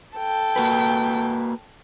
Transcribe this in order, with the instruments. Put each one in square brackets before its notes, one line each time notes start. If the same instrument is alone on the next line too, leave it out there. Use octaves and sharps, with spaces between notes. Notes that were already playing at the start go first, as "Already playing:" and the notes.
[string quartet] A4 G5
[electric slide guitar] A#3 F#4 B4